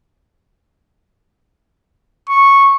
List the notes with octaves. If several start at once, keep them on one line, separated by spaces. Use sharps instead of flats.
C#6